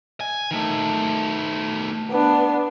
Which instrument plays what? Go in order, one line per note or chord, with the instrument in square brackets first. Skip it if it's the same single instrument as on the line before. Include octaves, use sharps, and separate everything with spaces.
[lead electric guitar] G#5
D#3 A3
[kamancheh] B3 D4